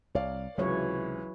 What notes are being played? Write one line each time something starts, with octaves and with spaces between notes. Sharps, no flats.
C2 C#5 D5 F5
C#2 C3 E3 F#3 C#5